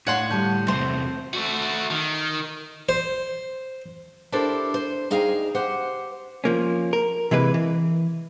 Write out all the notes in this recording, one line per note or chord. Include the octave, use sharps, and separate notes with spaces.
A2 D4 C#5 D5 F5 F#5 C6
D3 G3 A5 G6
E2 C3 F#3 A3 C4 C5 C6
A3 F#4
D#3
C5
D4 E4 G4 A4 A#4 C5
C5
D2 D#4 G#4 F5 G5 A#5
G4 C5 F#5
F3 A#3 C#4
A#4
C3 E3 G#3 A#3 B4
E3